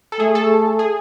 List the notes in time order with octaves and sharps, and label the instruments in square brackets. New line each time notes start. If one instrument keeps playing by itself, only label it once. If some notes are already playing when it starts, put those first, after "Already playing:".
[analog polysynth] A4
[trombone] A3 [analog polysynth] G#4
[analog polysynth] A4
G#4